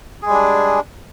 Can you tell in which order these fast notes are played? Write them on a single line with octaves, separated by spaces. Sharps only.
G#4 G#3 G3 D4